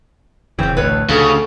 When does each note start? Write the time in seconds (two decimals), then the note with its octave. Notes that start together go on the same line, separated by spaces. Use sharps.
0.59 E1 C#3 E3 C4 C#4
0.77 A1 D2 B4 C#5
1.09 D2 C#3 A3 A4